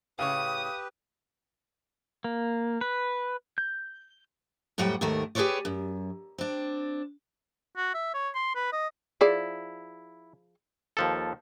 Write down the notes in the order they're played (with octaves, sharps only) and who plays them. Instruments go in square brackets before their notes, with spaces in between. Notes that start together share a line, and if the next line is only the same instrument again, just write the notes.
[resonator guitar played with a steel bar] A2 C#3 C#5 [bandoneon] G4 B4 [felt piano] F5 [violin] D#6
[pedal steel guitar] A#3
B4
G6
[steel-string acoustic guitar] F2 A2 F#3 G3 F#5 G5
D#2 G#2 D#3 A3 A#4
G4 G#4 A#4 B4 C#5 D5
F#2
C4 D4
[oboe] F#4
E5
C#5
C6
B4
D#5
[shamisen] F3 G#4 D5 [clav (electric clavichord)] E4
[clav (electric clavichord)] D#2 F3 A4